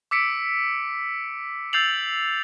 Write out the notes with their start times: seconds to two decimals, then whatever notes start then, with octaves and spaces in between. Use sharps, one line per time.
0.11 D6 E6 B6 C#7 D7
1.73 E6 G6 A6 C7 F7 F#7